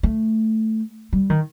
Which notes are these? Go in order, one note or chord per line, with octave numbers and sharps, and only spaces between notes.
A3
G3
D#3